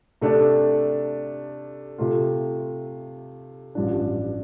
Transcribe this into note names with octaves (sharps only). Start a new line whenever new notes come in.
C3 A3 D4 A4 D5
C3 A3 F4
A1 G2 F3 D4